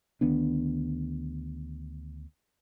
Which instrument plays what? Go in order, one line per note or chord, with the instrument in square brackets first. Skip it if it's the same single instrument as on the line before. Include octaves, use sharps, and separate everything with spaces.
[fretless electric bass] D2 D#3 B3 D4